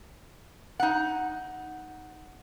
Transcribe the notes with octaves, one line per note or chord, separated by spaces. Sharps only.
D#4 F#5